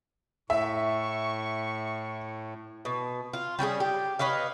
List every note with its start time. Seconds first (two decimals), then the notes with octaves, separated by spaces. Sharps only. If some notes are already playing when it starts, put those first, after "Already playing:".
0.50 A2 E5 C#6
2.85 B2
3.33 F4
3.59 G3 C#4 F#4 G#4
3.80 G4
4.19 B4 C#5 D#5 F5